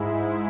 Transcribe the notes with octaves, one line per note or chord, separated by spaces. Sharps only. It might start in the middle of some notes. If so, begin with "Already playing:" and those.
Already playing: G#2 G#3 E4